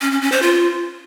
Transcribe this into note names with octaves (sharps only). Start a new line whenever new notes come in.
C#4
C#4
C#4
C5
F4